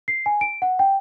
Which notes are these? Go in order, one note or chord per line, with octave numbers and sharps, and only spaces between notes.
C7
G#5
D7
F#5
G5